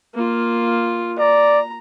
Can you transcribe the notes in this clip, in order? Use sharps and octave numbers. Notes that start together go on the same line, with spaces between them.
A#3 F4
D5 A#5